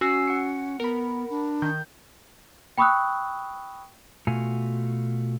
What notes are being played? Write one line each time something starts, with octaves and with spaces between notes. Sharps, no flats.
C#4 F#4 G#5 E6 C7
F#5 C#7
B3 A#4 B5
D4
D#3 G6
G5 B5 C#6 D#6 E6 F#6
B2 A3 F4 F#4 G#5